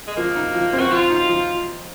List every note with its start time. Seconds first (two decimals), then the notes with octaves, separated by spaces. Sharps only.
0.08 G#3
0.17 F3 A#3
0.36 D#4
0.54 F3
0.73 C4
0.80 F#4
0.92 F3 F4
1.10 D#4
1.29 F3